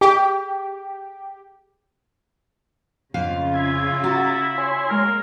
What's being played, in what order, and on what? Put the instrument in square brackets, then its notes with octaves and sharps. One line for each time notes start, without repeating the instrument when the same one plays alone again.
[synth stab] G4 [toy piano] G#4
[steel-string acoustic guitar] F2 F5 [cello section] C#3 F4
[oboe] E4 [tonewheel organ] G#6
[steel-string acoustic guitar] F#4 [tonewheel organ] A#5 A6
[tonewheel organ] C#5 G#5 C6
[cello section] G#3 A#3 [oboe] A#4